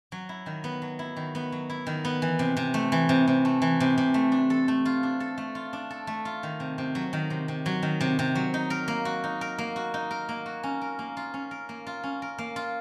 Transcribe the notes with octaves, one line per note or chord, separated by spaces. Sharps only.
F#3
E4
D#3
B3
F#3
E4
D#3
B3
F#3
E4
D#3
B3
E3
C3
C3
A3
E3
C3
C3
A3
E3
C3
C3
A3
D4
A4
A3
F4
D4
A4
A3
F4
D4
A4
A3
F4
D#3
C3
C3
F#3
D#3
C3
C3
F#3
D#3
C3
C3
F#3
D#4
A#4
A#3
F#4
D#4
A#4
A#3
F#4
D#4
A#4
A#3
F#4
C#4
A#4
A#3
F4
C#4
A#4
A#3
F4
C#4
A#4
A#3
F4